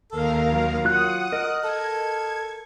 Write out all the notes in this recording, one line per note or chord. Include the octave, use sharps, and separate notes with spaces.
D#2 A4 A#4 F5
F#3
F4 F#5 D#6 F#6
A#4 D#5
A4 G#6